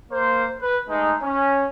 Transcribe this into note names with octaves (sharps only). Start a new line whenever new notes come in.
A#3 C5
B4
G#3 A3 D#4
C#4